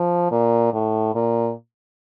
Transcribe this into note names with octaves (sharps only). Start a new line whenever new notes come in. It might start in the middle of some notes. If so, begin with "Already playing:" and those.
Already playing: F3
A#2
A2
A#2